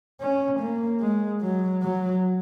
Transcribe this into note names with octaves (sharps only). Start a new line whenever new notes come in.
C#4
A#3
G#3
F#3
F#3